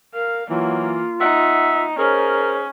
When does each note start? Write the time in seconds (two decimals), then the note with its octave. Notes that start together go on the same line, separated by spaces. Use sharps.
0.14 A#4 F5
0.50 E3 F#3 A#3 F4
1.21 D#4 E5 F#5
1.98 C#4 G#4 A#4 C5